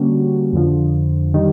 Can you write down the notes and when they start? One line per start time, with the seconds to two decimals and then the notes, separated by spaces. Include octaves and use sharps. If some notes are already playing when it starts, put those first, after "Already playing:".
Already playing: D3 G3 A#3 C#4 F#4
0.53 F2 D3 F3
1.34 D#3 G3